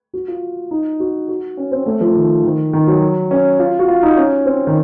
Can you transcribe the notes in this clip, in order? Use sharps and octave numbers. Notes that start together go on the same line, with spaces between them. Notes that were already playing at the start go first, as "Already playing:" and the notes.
F#4
F4
D#4
F#4
F#4
C#4
C4
A3
F3
D#3
D#3
D#3
F#3
C#4
F4
F#4
F4
D#4
C#4
C4
D#3